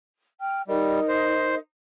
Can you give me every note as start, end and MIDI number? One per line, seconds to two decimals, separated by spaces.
0.41 0.61 79
0.41 0.61 89
0.68 1.00 55
0.68 1.57 63
0.68 1.57 70
0.68 1.57 75
1.08 1.55 72